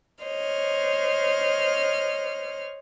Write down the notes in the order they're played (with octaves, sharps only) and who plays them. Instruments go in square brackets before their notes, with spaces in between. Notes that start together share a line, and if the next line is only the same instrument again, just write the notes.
[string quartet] C5 C#5 D#5 F6